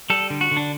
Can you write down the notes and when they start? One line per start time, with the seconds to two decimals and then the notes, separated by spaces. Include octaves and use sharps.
0.10 G3 A4
0.30 D3
0.41 F#4
0.51 D3
0.57 D4